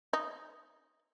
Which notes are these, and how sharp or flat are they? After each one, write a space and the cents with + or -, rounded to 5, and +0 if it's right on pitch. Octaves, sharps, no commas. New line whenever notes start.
D#4 -5